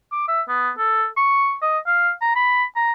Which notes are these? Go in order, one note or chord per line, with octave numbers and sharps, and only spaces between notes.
D6
E5
B3
A4
C#6
D#5
F5
A#5
B5
A#5